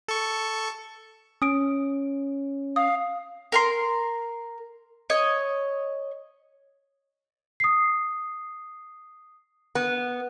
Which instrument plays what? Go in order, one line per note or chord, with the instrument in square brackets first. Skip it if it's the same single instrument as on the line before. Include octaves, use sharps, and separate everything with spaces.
[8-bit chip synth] A4 C#6
[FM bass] C#4 [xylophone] D#6 D7
[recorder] F5 [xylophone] D#6
[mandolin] A#4 A#5 C6
C#5 D#5
[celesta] D#6 C7
[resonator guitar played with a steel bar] B3